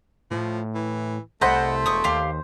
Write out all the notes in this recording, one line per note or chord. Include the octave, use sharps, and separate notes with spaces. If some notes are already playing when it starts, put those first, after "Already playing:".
A2 F3
E3
C2 A3 C5 D#5 F#5 B5
E1 C#6 D#6
D#2 G4 F5 C6